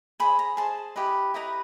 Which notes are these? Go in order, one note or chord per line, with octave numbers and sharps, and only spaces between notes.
G#4 C5 D#5 B5
A#5
G#4 C5 D#5 A5
E4 G4 B4 D#5
E4 G4 B4 D#5 A#5